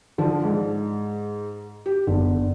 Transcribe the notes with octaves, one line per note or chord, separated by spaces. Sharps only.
D3 F3
G#2
G4
F#1 F#2 D3 B3